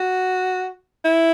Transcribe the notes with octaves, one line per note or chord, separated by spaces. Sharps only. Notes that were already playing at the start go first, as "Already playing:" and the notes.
Already playing: F#4
E4